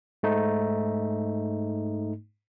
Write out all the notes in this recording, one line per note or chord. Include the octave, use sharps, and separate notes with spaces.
G#2 A3 D#4